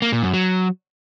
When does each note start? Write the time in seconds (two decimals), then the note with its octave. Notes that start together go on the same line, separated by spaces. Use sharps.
0.02 A#3
0.13 A#2
0.23 F#2
0.34 F#3